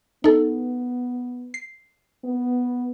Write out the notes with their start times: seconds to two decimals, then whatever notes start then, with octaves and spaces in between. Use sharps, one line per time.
0.24 B3 D#4 A4
1.54 C7
2.24 B3